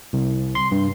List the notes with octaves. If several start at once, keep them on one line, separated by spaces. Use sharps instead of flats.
C2
C6
G2